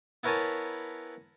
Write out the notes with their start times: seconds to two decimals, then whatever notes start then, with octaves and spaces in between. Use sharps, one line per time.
0.23 B3 E4 A#4 C#5 G#5 A5